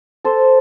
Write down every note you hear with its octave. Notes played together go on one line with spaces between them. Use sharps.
A4 C5